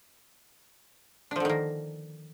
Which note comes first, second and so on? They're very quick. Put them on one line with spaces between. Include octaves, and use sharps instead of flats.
D4 F3 D3 D#3 A#3